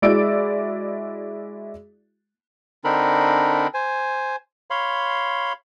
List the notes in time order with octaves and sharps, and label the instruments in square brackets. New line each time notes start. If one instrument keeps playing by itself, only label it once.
[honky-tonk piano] G#3 E4 F#4 D5 E6 D7
[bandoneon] D3 C4 D4 D#4 A#4 B5
C5 G#5
C#5 F5 B5 C6